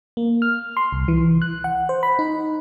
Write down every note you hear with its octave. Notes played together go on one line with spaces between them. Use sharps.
A#3
F6
C6
C2
E3
F#6
F#5
C5
B5
D#4